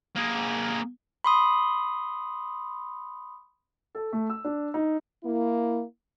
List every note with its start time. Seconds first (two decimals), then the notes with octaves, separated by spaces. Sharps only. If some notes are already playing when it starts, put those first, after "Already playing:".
0.16 A#3 G#4
1.24 B5 C6 D#6
3.95 A4
4.13 A3
4.30 E6
4.44 D4
4.74 D#4
5.24 A#3 E4